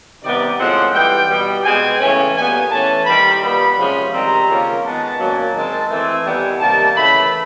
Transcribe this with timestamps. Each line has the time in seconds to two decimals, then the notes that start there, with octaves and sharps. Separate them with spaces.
0.23 C3 D#3 G3 B3 D5
0.59 A2 F3 G#3 C4 F#5
0.93 E3 G3 B3 G5
1.29 B2 G3 B3
1.65 B2 G#3 C4 G#5
2.00 C#3 E3 A3 C#4
2.35 A#2 G3 B3 G#5
2.71 E3 A3 C#4 A5
3.06 D#3 G3 C4 B5
3.41 A#2 G3 B3 B5
3.77 C3 F3 G#3 C#4
4.12 D#3 G3 C4 A#5
4.48 C#3 F3 A#3 C#4
4.83 D#3 G#3 B3 A5
5.18 A#2 F#3 A#3 C#4
5.55 D#3 G#3 C4 A5
5.89 E3 A3 C4 G#5
6.25 D#3 G3 B3
6.60 C3 D#3 G3 A#3 A5
6.95 C#3 E3 A3 B5